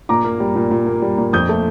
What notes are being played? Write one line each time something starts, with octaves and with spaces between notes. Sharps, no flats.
A#2 A#5 D6
A#3
G3
A#2
A#2
A#3
G3
A#2
F2 D#6 G6
A3